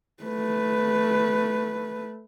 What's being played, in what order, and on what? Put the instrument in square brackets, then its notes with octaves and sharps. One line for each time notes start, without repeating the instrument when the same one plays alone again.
[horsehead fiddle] A3 B4